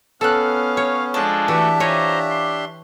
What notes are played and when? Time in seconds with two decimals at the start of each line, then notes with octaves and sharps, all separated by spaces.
0.21 B3 C#4 A4 F5 E6 F#6
0.77 C#5
1.14 F3 G#3 D4 A4
1.48 E3 A3 D4 F#4 G4 E5
1.80 F4 C5 C#5 G#5 A#5
2.30 C6